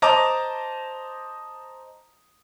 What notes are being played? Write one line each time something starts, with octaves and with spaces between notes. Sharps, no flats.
C5 D#5 A5 A#5 D6 D#6